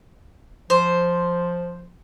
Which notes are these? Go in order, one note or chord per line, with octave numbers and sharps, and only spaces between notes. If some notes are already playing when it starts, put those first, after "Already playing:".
F3 C5